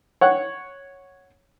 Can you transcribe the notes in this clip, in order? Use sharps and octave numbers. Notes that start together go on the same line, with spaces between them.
C#5 F#5